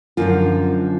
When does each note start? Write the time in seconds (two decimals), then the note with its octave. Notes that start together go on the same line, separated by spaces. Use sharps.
0.17 F#2 D3 F3 F4